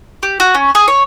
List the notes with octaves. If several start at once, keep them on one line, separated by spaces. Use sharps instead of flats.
G4
F#4
C#4
G#4
C#5